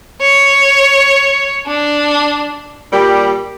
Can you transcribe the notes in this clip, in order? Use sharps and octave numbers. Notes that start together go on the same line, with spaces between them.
C#5
D4
A#2 G3